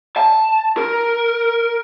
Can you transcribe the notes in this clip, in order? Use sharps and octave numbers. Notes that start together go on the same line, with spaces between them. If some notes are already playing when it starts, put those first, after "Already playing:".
A5
A#4